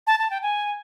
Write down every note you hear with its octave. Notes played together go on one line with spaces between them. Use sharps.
A5
A5
G5
G#5